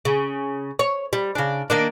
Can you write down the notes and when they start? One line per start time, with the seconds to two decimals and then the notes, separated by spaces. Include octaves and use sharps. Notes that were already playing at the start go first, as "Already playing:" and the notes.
0.05 C#3
0.79 C#5
1.13 G3
1.35 C#3 D4
1.70 D#3 A#3 D4